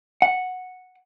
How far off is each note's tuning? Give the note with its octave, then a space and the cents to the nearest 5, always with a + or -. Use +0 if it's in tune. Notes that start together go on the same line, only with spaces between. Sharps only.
F#5 -5